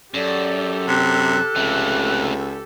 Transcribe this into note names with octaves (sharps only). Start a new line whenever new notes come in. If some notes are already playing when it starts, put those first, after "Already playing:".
F#2 G4 A4 D5
C3 F#6
C#2 C3 A3